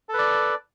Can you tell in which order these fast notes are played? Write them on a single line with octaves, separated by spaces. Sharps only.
A4 B4 D5